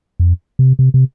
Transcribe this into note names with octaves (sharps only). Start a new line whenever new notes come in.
F2
C3
C3
C3